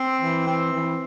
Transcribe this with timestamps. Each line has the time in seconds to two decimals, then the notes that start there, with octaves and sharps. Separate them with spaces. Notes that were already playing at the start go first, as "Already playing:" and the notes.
Already playing: C4
0.20 E3
0.46 C4
0.72 E3